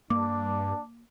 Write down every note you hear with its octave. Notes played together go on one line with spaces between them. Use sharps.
G2 A#3 D4 D6